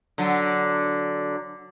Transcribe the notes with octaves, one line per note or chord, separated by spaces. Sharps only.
D3 F#3